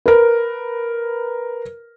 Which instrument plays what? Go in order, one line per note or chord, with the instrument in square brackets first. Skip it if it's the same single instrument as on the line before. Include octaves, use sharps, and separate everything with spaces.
[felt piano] A#4 B4